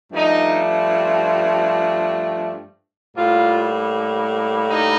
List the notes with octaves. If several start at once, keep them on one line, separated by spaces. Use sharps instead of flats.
G2 F3 A3 D#4
A2 G3 A#3 F4
D#4